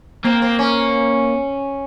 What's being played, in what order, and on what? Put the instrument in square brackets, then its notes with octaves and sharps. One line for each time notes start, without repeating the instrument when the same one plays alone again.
[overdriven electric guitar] A#3 [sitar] C4
[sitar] C4
C#4